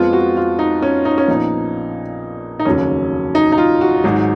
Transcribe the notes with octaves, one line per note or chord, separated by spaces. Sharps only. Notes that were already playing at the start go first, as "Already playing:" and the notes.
Already playing: F2 F3 G#3 B3 F4
F#4
F4
D#4
C#4
D#4
C#4
A#1 A#2 F3 B3 D#4
D#4
F1 D#2 C#3 F#3 C#4
D#4
D#4
F4
F#4
G#1 G#2 F#3